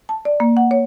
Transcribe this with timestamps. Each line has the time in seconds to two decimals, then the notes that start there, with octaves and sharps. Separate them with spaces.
0.09 A5
0.25 D5
0.40 A#3
0.57 F#5
0.71 C#5